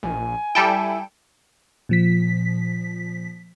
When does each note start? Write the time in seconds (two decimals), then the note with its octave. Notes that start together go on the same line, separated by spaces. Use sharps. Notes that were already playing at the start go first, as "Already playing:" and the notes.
0.03 A#1 G#5
0.55 G3 E4 A4 G5
1.89 A#2 F3 B6